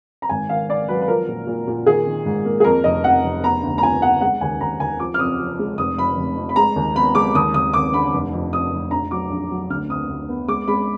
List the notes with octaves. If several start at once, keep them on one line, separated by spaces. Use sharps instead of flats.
A#5
G#1 G#5
D#3 F5
D#3 D5
F#3 B4
B4
F3 A#4
A#2
A#2
A#2
D#3 G#4
D#3
G#2
A#3
G#4
F2 A#4
F1 D#5
F2 F#5
F1
B3 A#5
D2
A#5
F3 G#5
B3 F#5
G#3 F#5
D#2 G#5
D#2 A#5
D#2 G#5
F3 D6
F6
F2 D#6
F3
G#3
F1 D#6
F2 B5
F1
F2
B5
G#3 A#5
D#2
B3 B5
G#3 D6
D#2 D#6
D#2 D#6
D#2 D6
D3 B5
F1
F2
F2 D#6
F1
A#1 A#5
F#3 D6
A#1
F#3
D2 F6
D2 D#6
D2
B3
G#3 D6
G#3 B5